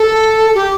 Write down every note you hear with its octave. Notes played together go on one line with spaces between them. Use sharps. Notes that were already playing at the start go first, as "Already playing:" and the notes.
Already playing: A4
G4